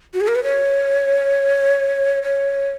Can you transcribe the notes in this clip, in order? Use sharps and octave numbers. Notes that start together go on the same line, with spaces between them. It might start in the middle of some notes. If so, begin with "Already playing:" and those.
F#4
G#4
A#4
B4
C#5
C#5